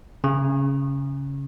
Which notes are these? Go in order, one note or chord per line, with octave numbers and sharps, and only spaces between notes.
C#3